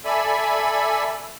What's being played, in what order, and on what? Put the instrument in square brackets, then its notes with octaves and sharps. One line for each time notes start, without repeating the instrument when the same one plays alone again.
[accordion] A4 D5 E5 G#5 B5